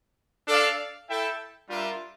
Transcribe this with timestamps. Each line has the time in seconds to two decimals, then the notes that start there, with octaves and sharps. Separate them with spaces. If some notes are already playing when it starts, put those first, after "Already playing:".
0.48 D4 A4 D5 F5
1.09 E4 A4 E5 G5
1.70 G3 D4 F4 A#4 E5